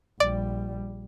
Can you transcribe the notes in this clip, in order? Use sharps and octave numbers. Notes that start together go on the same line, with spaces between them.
A#1 G3 D5